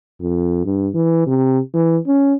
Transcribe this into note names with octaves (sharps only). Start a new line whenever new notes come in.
F2
G2
E3
C3
E3
C#4